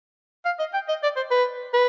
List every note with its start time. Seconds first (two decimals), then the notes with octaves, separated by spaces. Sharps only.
0.45 F5
0.59 D#5
0.73 G5
0.88 D#5
1.03 D5
1.16 C5
1.31 B4
1.73 B4